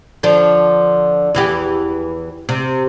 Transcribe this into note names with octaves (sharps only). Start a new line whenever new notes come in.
D3 F3 D4
E2 E3 G4
C3